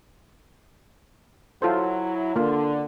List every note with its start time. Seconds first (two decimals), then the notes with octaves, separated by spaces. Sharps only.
1.62 F#3 E4 F4 A4 C5
2.36 D3 A#3 F4